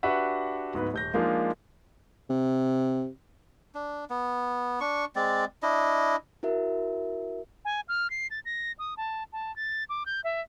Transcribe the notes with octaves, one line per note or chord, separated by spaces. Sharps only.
D4 F#4 G4 B4 E5 F#5
D1 G#2 B3 B4
D#1 G6 A#6
F3 G#3 A#3 D4 D#4 F4
C3
D4
B3
D4 C#6
G#3 C4 D5
D4 E4 D#5
E4 F#4 A#4 E5
G#5
F6
C7
A6
A#6
D#6
A5
A5
A6
D6
G6
E5